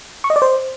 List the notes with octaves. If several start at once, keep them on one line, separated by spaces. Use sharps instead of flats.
C#6
D#5
D5
C5